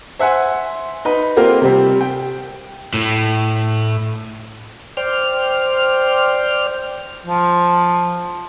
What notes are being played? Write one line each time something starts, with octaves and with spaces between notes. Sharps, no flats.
C5 E5 F#5 G#5
D#4 B4
A#3 C4 F4 G4 A#4 C5
C3 G3 C4
G5
A2
C5 D5 G5 F6
F3